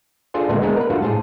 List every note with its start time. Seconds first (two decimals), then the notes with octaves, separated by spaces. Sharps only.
0.34 D4 F4 G#4 A4 C5
0.49 D2 A#2 G#3 A3 B3 C4
0.62 G#3 A#3 B3 D4 G#4 A#4
0.76 A#4 B4
0.90 G2 A3 F4 F#4
1.02 A2 G#4 C5 A5